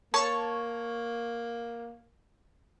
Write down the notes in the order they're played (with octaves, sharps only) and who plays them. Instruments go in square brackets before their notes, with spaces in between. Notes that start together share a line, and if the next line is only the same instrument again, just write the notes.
[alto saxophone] A#3 [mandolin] C#5 [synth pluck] A5 C#6